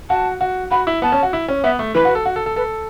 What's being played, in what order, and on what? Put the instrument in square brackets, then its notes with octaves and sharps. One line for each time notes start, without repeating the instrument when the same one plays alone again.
[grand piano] F#4 [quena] A5
[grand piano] F#4
[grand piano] F#4 [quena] B5
[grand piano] E4
[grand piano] B3 [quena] A5
[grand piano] C#4
F#4
E4
C#4
[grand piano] B3 [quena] E5
[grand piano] A3
[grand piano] E3 [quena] B4
[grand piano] F#4
A4
F#4
A4
A4
[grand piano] A4 [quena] B4